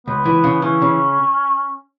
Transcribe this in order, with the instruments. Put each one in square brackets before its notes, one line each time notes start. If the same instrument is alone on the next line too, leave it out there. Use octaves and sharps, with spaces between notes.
[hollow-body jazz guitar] C#2 [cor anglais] B3
[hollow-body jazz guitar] E3
C#3
[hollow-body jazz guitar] E3 [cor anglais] C#4
[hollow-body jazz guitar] C#3